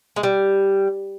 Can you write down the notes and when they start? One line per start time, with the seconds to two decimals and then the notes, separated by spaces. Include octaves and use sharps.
0.16 G#3
0.23 G3